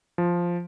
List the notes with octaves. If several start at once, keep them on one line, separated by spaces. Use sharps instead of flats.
F3